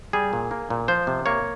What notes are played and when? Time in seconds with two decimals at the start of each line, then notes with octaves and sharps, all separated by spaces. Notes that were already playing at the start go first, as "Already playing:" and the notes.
0.13 G3 G#4
0.33 A#2
0.51 A#3
0.70 A#2
0.88 F3 C5
1.07 C3
1.26 A#3 C#5